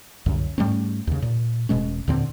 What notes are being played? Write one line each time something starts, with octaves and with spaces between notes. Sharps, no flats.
C2 F#2 D3
G#2 G3 A3 C#4
D#2 C#3
A#2
E1 B2 G#3 C#4
D#2 A#2 D3 C4